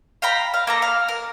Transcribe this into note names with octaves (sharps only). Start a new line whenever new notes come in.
F5 G5 A#5 B5
F5
A#3 A4 A#5
F5
A#4